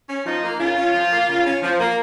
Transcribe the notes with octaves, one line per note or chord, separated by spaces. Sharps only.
C#4
F3 D#4
A#3
C#3 F4
C#4
F3
A#3
C#3
C#4
F3
A#3